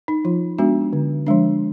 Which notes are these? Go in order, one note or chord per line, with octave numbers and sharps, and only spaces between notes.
D#4
F3 F4
G#3 B3 D4 F#4
D3
F3 G#3 D4